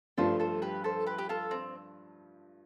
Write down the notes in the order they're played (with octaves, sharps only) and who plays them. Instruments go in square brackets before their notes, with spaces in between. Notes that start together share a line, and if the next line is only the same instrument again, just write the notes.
[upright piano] G2 F3 A3 D4 F4 [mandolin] A4 C5
[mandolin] A4 C5
G4 B4
A4 C5
G4 B4
G4
F4 A4
C4